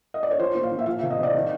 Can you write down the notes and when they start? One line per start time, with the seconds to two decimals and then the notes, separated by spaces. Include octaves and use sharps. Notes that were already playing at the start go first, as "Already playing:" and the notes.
0.14 D#5
0.23 D5
0.31 C#5
0.39 F3 C5
0.55 A#2
0.63 F5
0.71 A#2
0.79 E5
0.86 F3 F5
0.99 C3 E5
1.10 D#5
1.18 C3 D5
1.34 D#3